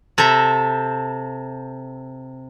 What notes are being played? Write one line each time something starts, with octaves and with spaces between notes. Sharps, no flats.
C3 A4 E5 A#5